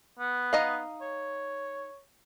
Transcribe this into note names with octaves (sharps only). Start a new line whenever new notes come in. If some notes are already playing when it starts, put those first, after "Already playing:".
B3
D#4 D#5 F5
C#5